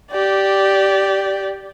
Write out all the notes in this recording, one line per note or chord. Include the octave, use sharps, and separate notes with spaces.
G4 D5